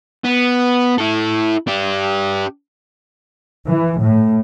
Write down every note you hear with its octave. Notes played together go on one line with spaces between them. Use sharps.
B3
E4 A4
D4 G4
E3
A2